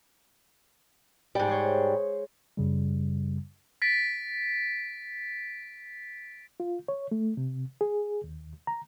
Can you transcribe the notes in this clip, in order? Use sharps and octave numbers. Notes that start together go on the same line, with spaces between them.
G#2 G3
G#3 C5 C#5
F#2 C#3 G3
A6 B6 D7
F4
C#5
A3
C3
G#4
D#2
A#5